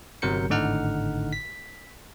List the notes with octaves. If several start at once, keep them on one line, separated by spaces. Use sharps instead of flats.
G1 C3 F#3 A#4 G6 C#7
G#1 A2 D3 D#4 F#5 F6
B6